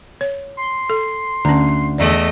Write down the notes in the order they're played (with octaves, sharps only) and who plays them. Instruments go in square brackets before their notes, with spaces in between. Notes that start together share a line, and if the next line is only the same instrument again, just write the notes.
[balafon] C#5
[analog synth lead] C6
[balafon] A4
[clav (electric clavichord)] D2 [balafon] C#4 A#5
[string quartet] E2 A3 D#5 [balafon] D5